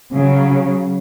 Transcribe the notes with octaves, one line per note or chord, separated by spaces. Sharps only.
C#3 F#3